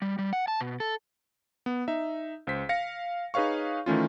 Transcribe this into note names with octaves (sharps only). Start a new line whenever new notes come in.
G3
G3
F#5
A5
B2
A4
B3
D#4 E5
C#2 C5 B6
F5 A#6 C#7
D#4 G#4 B4 C#5 F5 C#6
D#3 E3 A3 C#4 F4